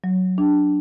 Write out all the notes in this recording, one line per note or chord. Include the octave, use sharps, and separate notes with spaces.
F#3
D4